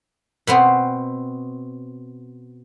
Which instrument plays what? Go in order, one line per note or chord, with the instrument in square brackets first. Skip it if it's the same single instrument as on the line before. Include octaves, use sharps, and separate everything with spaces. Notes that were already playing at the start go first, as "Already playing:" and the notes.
[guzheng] B2 B3 C4